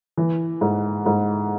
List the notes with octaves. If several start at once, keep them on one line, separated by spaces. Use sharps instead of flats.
E3
G#2
G#2